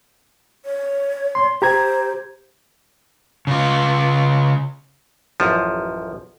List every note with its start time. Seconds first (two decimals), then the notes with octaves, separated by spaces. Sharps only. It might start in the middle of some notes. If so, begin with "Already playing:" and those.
0.65 C#5
1.35 C6
1.62 G4 C5 A#5 G#6
3.47 C#3 F4
5.40 A1 F#2 F3